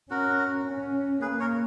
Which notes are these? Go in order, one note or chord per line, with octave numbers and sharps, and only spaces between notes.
C#4 F#4 A#4
C#4
A#3 G#4 B4
A#4 C#5